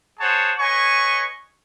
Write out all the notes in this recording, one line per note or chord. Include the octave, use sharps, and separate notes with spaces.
G#4 C5 C#5 F#5 A5
B4 C#5 D#5 G#5 C#6